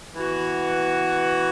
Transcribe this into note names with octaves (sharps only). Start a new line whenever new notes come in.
E3 B3 F#4